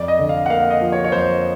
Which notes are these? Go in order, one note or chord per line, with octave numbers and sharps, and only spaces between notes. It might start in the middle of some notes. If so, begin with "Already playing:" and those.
Already playing: F2 D5
D#5
D3
F5
F#5
A#3 F5
D#5
F3
C#5
C#5
F2 C5